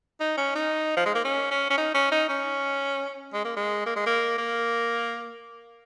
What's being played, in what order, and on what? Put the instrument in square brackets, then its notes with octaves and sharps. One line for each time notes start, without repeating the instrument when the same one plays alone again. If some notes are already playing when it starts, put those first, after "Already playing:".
[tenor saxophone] D#4
C#4
D#4
F3
G#3
A#3
C#4
C#4
C#4
D#4
C#4
D#4
C#4
G#3
A#3
G#3
A#3
G#3
A#3
A#3